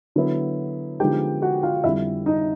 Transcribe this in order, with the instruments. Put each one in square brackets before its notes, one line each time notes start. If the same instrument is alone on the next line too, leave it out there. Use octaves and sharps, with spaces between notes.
[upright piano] D3 F#3 B3 E4
D3 F3 G#3 B3 D#4 G4 G5
F#4 F#5
F4 F5
F2 E4 E5
D3 G3
D#4 D#5